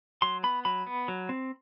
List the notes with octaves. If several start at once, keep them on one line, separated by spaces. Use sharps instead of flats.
F#3 C6
B3 B5
F#3 B5
B3
F#3
C4